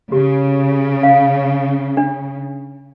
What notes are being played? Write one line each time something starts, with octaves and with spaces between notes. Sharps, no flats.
C#3 G4
F5
D4